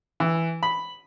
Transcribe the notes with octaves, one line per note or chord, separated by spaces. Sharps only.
E3
B5